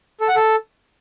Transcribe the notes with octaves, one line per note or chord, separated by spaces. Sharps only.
A4
F#5
A4